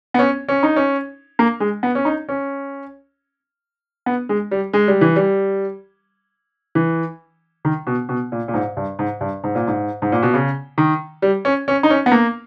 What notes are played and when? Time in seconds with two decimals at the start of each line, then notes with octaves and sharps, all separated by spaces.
0.14 B3
0.19 C#4
0.49 C#4
0.63 D#4
0.76 C#4
1.39 A#3
1.60 G#3
1.83 B3
1.95 C#4
2.05 D#4
2.29 C#4
4.06 B3
4.29 G#3
4.51 G3
4.73 G#3
4.88 G3
5.01 E3
5.16 G3
6.75 E3
7.65 D#3
7.87 B2
8.09 B2
8.32 A#2
8.48 A#2
8.54 G#2
8.77 G2
8.99 G#2
9.21 G2
9.44 G#2
9.55 A#2
9.67 G#2
10.02 G#2
10.12 A#2
10.23 B2
10.34 C#3
10.78 D#3
11.22 G3
11.45 C#4
11.68 C#4
11.83 D#4
11.90 C#4
12.06 B3
12.12 A#3